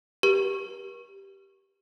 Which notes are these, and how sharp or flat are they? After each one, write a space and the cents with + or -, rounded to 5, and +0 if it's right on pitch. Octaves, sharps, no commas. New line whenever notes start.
G4 +0 A#4 +45